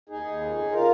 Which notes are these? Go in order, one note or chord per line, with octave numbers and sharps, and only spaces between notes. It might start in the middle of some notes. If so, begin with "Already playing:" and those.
D#2 D#4 G#4
D#2
F2
C#3
C#3 F4 A#4